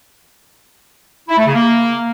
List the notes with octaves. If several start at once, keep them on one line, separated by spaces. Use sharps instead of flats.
E4
A3
C#3
A#3